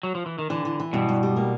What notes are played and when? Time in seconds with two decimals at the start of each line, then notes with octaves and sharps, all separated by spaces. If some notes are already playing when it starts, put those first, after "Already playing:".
0.03 F#3
0.15 F3
0.26 E3
0.38 D#3
0.50 D3 E3
0.65 E3
0.80 E3
0.93 G2 B2
1.09 G2
1.23 G3
1.37 A#3